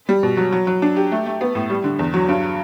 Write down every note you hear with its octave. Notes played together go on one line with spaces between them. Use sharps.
G3
B2
F#3
F#3
F#3
D4
G4
A3
A3
B3
A2
G3
D3
E2
F#3
G2